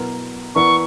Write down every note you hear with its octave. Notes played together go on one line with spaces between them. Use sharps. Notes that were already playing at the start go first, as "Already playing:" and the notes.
Already playing: B2 F#3 B3 E4 A#4
E3 B3 E4 A#4 D5 C#6